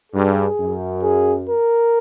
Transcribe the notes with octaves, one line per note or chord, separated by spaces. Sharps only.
G2 G#4
F#2
G#4
A#4